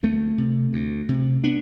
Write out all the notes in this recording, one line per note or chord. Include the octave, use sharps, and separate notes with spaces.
D2 A3 C4
C3
D2
C3
B3 D4